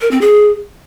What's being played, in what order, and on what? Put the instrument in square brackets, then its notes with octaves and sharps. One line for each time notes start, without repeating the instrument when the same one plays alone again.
[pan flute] A#4
C4
G#4